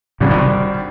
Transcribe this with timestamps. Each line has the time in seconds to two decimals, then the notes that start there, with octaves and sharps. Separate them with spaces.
0.20 G#1 G2 A#2 C#3 G3
0.30 C3 D#3